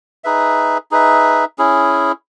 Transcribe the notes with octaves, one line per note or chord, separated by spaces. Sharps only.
D#4 G#4 B4 E5
D#4 G#4 B4 E5
C#4 E4 G#4